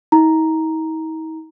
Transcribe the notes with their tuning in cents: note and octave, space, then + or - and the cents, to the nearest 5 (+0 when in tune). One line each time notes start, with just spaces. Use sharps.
D#4 +45 A#5 +0